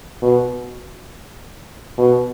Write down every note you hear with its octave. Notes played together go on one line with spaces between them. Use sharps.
B2
B2